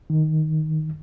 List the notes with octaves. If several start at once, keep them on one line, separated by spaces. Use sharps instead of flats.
D#3